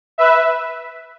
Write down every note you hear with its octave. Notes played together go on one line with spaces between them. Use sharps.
B4 E5